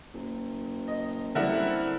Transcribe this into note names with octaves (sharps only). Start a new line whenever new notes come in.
F#1
D#5
D3 G3 C4 E4 A#4 E5 F#5